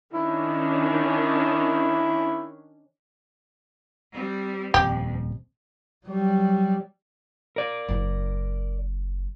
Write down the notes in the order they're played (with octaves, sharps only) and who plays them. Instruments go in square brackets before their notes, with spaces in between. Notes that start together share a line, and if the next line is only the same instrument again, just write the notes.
[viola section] D#3 C#4 D4 [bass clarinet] E4
[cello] G3 C4
[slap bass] D#1 [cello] F2 [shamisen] G4
[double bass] F#3 G3
[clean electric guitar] A#4 D5
[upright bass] F#1 E4